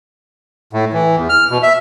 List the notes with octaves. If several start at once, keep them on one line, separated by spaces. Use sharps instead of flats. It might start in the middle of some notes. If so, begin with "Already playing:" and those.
A2
E3
E2
F6
B2
E5